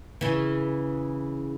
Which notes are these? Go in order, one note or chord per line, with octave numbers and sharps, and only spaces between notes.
C#3 E3